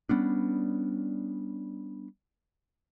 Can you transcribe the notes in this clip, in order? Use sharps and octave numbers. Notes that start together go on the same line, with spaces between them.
G3 B3 C#4 D4